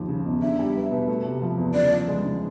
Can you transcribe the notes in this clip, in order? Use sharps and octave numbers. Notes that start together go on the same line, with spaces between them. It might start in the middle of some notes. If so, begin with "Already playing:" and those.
Already playing: D#2 F3
C#3
E1
D4 E5
G3
B3
B2
A3
C3
F3
E2
C#3 D5
F3
G#3
C#3